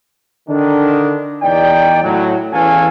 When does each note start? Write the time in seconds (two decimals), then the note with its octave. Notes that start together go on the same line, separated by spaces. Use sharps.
0.49 D3 D#3 D4
1.43 E2 D#4 D5 G5
2.03 A2 F#3
2.53 E2 E3 C#4 A4 F5 G#5